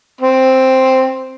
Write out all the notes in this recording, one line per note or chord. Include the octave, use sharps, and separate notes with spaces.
C4